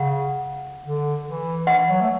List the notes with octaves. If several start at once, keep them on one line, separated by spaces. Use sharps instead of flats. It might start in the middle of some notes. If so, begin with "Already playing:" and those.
Already playing: C#3 F#5
D3
E3
E3 F#5
F#3
A3